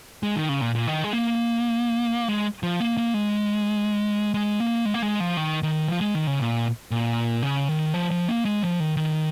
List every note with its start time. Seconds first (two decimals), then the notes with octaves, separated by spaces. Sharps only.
0.23 G#3
0.36 D#3
0.49 C#3
0.61 A#2
0.75 A#2
0.87 D#3
1.04 G#3
1.13 A#3
2.28 G#3
2.63 F3
2.80 A#3
2.97 A#3
3.14 G#3
4.34 G#3
4.60 A#3
4.85 G#3
4.94 A#3
5.02 G#3
5.20 F3
5.37 D#3
5.63 D#3
5.88 F3
6.01 G#3
6.15 D#3
6.27 C#3
6.40 A#2
6.91 A#2
7.42 C#3
7.69 D#3
7.94 F3
8.11 F3
8.28 A#3
8.45 G#3
8.63 F3
8.80 D#3
8.97 D#3